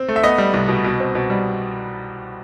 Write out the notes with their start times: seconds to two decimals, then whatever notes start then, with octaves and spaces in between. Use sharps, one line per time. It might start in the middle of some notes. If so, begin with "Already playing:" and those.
Already playing: C4
0.08 A3
0.16 E5
0.23 B3 D#5
0.38 G3
0.54 C2
0.68 B2
0.84 B2
1.00 C4
1.15 B2
1.30 G3